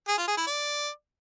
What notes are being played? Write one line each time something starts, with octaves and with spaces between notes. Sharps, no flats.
G#4
F4
G#4
E4
D5